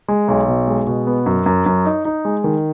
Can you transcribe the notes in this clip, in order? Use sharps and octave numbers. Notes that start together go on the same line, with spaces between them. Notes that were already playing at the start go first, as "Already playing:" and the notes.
G#3
B1
B2
G#3
B2
B3
F#2
F#2
F#2
D#4
D#4
G#3
D#3